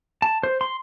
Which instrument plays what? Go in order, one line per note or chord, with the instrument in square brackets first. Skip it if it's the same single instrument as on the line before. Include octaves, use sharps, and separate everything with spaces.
[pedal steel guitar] A5
C5
C6